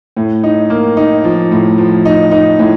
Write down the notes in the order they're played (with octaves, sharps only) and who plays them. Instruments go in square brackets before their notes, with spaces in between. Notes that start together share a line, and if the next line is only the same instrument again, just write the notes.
[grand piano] A2
D#4
A#3
D#4
F3
A2
F3
D#4
D#4
A2